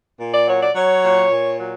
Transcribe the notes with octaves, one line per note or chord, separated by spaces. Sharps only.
A#2
D5
F#3 C#5
D5
F#3 C#5
A#2
A#2
F#3